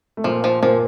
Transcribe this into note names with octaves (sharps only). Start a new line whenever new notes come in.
A3
A#2 F3 A#3
F3
A#2 F3 A#3